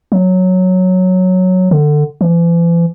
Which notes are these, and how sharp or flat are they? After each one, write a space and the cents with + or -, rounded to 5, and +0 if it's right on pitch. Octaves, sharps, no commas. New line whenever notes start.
F#3 -5
D3 +20
E3 +45